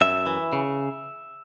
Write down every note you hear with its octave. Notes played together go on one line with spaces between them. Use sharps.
F#2 E5
E3
C#3